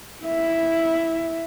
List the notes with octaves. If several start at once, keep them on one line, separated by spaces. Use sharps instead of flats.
E4 E5